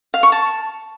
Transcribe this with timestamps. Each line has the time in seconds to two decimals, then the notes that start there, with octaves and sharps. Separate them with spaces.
0.14 F5
0.23 C#6
0.32 A5